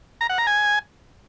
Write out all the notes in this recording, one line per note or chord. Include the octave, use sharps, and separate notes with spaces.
A#5
F#5
A#5
G#5